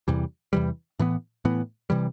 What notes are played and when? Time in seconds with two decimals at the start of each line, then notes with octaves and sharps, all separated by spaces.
0.08 E2 C3 E3 G3
0.53 E2 C3 E3 G3
0.99 A2 E3 B3
1.45 A2 E3 B3
1.90 C3 E3 G3